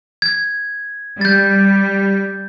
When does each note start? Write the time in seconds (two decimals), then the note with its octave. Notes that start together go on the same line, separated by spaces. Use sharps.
0.22 G#6
1.21 G3 G6 A6